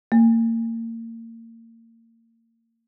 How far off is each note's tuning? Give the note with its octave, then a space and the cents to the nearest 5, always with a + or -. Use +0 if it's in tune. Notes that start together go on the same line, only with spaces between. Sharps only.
A#3 -35